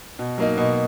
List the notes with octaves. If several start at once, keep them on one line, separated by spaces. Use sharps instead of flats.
B2
F#3 A#3 D#4
B2